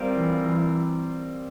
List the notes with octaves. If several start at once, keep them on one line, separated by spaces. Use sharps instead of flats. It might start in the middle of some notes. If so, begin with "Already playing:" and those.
Already playing: G3 C4 F4 A#4
E3
E3